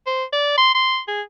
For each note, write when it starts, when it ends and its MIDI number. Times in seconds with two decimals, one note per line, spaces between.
0.06 0.24 72
0.32 0.52 74
0.58 0.71 84
0.75 0.99 84
1.08 1.21 68